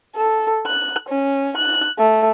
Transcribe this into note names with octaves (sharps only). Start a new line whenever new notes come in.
A4
F#6
C#4
F#6
A3